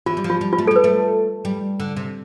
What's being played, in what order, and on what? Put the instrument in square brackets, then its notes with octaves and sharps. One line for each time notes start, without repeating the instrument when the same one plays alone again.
[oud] E3 [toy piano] F4
[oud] G3
F3
[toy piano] F4
[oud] G3
[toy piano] F4
[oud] A3
[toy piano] A4
[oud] G3 [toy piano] B4
[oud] A3
G3
D3
C3